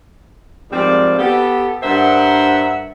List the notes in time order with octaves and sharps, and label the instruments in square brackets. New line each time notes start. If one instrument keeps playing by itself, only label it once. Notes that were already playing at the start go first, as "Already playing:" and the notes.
[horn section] G#2 F3 G3 C4 A#4 D5
B3 G4 A4
G2 A#4 C5 E5 F#5